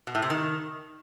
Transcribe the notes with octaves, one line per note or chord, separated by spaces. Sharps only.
B2
A2
C3
D#3